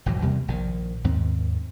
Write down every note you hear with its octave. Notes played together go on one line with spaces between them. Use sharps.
G#1 E2 B2 F#3
E2 C3 G3 A#3
A#1 D#3
D#2 G#2 D#3 C4